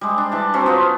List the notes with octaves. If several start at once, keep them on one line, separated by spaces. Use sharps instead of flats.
G3 G#3
D4
E3 A5
F#3 C4 C#4 C5
B3 F4